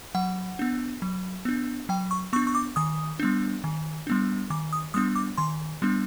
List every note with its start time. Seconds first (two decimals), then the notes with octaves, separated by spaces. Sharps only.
0.15 F#3 F#5
0.59 B3 D4
1.02 F#3
1.45 B3 D4
1.89 F#3 G5
2.11 C#6
2.33 B3 C#6
2.36 D4
2.47 C#6
2.55 D6
2.76 D#3 D#6
3.19 G3 B3 D4
3.64 D#3
4.07 G3 B3 D4
4.50 D#3 D6
4.73 D#6
4.94 G3 B3 D4 D#6
5.16 D6
5.38 D#3 C6
5.82 G3 B3 D4